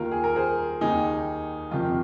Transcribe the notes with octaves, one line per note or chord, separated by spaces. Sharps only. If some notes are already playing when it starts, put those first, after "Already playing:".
Already playing: D#2 D#3 F4 A#4
G#4
A#4
G#4 C5
D#2 D#3 D#4 G#4
F2 C3 D#3 F4